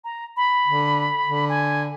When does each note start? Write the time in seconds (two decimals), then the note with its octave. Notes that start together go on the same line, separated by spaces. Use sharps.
0.04 A#5
0.37 B5
0.67 D3
1.26 D3
1.49 G#5